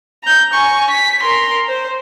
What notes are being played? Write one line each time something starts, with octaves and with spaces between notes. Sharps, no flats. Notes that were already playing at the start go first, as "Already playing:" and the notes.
A#5 G6
G#5 C#6
B6
A#4 C6
C5